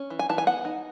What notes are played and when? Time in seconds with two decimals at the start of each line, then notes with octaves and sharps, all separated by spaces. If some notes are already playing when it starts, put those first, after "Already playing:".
Already playing: C#4
0.10 E3
0.19 G#5
0.29 E3 A5
0.38 G#5
0.47 B3 F#5
0.65 D#4